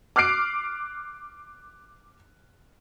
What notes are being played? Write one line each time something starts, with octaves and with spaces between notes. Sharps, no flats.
D6 F6 F#6 C7 D7